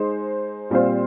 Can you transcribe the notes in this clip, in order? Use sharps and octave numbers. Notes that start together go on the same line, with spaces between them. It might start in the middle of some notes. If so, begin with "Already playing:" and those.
Already playing: G#3 D#4 G#4 C5
A#2 G3 C4 F4 C5